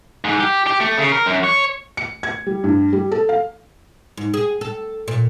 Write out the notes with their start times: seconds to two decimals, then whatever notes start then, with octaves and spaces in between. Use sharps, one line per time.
0.24 G#2
0.40 G4
0.67 G4
0.80 A3
0.98 C#3
1.12 A#4
1.26 F#2
1.44 C#5
1.97 C#7
2.23 G#6
2.47 G3
2.64 G2
2.93 G3
3.12 A4
3.29 F5
4.17 G#2
4.34 G#4
4.61 A4
5.08 A#2